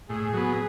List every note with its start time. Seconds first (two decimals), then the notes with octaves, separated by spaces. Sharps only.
0.09 A2 G#4
0.33 F#3 B3